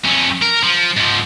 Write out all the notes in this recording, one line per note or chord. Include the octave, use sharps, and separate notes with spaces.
F2 C#4
A#4
F3
G#2 F3